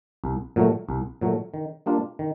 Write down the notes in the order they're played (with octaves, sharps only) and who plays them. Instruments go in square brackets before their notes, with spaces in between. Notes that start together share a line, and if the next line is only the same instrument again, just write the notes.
[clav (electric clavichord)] C2
A#2 F#3 A3
C2
A#2 F#3 A3
D#3
G3 A#3 D4 F4
D#3